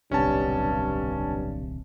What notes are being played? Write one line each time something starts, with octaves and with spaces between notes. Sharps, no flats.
D1 B1 G2 C3 C#4 A5